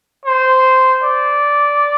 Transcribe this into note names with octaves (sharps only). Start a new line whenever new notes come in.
C5
D5